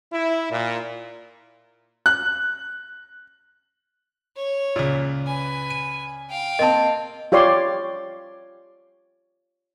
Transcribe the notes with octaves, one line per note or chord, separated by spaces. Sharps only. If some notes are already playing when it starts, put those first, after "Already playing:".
E4
A#2
F#6
C#5
C#2 A#2
B4 G#5
D#7
F5 G5
A#3 C4 D#5 A5
F4 G4 C#5 D5 C6